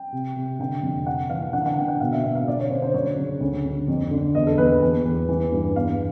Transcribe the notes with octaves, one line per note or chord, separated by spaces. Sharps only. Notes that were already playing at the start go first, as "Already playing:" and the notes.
Already playing: G5
C3
C3
D3 G5
F2
C3 F#5
E3 F5
D3 F#5
F#5
D3 G5
F#5
B2 F5
E5
B2 E5
F5
D3 D5
C#5
D3 C5
C5
F#2 C#5
C#3
D2
D2
F2
D3
E2 D#5
A4
E2 B4
E2
E2
E3
G2
E2 F5